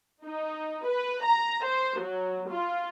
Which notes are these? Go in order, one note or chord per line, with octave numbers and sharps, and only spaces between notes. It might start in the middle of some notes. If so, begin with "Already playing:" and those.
D#4
B4
A#5
C5
F#3
F4